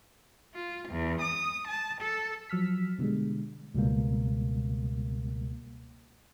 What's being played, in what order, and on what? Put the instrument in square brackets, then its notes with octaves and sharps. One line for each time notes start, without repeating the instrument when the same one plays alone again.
[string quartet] F4
E2
D#6
A5
A4
[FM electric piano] F3 F#3 E6 F6 B6
B2 D3 G3 G#3
[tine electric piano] C#2 B2 G3 A#3